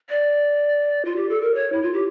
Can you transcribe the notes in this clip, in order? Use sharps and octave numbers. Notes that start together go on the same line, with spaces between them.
D5
F4
G4
A4
A#4
C#5
E4
F4
G4